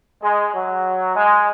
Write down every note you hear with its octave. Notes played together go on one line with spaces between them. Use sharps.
G#3
F#3
G#3